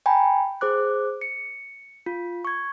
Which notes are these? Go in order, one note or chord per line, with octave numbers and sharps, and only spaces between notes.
G5 G#5 A#5 B5
G#4 C5 D6 F#6
C#7
F4
C#6 G#6